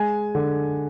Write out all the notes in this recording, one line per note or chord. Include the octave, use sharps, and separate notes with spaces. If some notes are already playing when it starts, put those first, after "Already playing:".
Already playing: G#3 G#5
D3